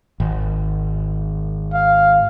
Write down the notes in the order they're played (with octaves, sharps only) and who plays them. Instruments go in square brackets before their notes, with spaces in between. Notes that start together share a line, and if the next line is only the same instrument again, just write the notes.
[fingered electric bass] G#1
[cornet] F5